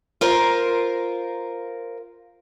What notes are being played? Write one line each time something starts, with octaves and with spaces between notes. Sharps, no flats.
F4 A#4 C5